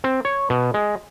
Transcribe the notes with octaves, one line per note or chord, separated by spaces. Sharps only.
C4
C#5
B2
G#3